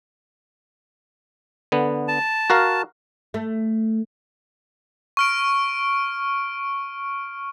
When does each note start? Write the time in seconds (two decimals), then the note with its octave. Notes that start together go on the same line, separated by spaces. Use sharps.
1.72 D3 B3
2.08 A5
2.50 F#4 A#4 F5
3.34 A3
5.17 C#6 F6 D7